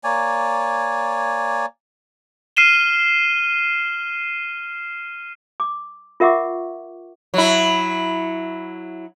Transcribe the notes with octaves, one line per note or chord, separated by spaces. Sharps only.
A#3 C#5 D5 G#5
F6 C7 D#7 E7 G7
D6
F4 A#4 E5 F#5 C#6 D6
F#3 E4